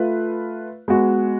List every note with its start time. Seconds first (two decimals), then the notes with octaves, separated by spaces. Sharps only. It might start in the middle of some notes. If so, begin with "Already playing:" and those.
Already playing: A3 F4 B4
0.88 G#3 B3 F#4